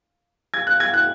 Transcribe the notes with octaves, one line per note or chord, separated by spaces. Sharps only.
G#6
F#6
G#6
F#6